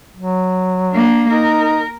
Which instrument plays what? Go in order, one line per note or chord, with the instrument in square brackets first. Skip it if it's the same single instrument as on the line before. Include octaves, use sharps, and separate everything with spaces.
[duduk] F#3
[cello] A#3 D4
[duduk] D#4 [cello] A#4